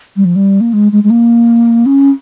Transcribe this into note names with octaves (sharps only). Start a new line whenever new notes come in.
G3
F3
G3
A#3
G#3
G#3
G#3
A#3
C#4